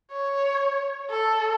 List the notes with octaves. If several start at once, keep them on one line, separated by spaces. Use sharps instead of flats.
C#5
A4